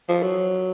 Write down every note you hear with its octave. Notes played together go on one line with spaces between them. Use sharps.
F3
F#3